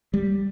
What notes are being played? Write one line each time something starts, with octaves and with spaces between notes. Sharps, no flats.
G3